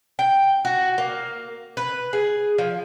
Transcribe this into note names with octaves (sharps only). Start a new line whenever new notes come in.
G5
F#4
A#3
B4
G#4
F3